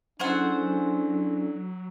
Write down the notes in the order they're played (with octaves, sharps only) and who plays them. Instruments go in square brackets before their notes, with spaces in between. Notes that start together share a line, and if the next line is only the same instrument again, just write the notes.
[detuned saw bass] F#3 [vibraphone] C#4 E4 A4 [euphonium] D4 [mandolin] G#4 C5 F#5